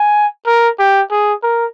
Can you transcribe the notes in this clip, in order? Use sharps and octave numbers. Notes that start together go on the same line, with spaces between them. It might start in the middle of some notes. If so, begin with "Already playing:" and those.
Already playing: G#5
A#4
G4
G#4
A#4